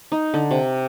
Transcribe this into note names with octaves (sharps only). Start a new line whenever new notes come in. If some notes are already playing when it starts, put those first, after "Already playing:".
D#4
D3
C3